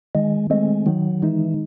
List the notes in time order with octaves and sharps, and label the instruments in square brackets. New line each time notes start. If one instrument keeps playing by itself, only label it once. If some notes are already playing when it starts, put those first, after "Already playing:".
[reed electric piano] D#3 [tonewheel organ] G#3
[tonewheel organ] G#3 [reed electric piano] A3 C4
[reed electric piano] D#3 [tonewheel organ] F#3
[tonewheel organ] E3 [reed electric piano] G#3 D#4